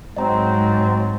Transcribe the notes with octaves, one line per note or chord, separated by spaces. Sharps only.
G#2 F#3 C4 D#5 A#5